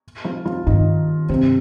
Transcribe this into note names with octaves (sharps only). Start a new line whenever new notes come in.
F3 F4
F3 F4
G2 D#3 D#4
G2 C3 C4